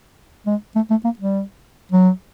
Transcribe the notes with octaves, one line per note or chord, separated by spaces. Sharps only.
G#3
A3
A3
A#3
G3
F#3